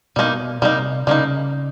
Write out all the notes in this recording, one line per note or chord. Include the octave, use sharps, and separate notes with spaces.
B2 G3 A#3 D#4
C3 G3 A#3 D#4
C#3 G3 A#3 D#4